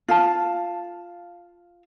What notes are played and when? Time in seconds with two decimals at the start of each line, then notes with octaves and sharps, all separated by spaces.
0.08 F4 F5 A5